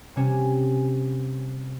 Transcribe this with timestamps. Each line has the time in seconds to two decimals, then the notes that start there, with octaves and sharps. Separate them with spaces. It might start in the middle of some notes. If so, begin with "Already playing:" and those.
0.16 C3 G3 C#4 C#5 G#5 E7